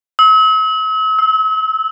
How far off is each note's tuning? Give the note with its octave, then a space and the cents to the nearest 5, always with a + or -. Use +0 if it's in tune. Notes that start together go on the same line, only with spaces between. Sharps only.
E6 -45
E6 -20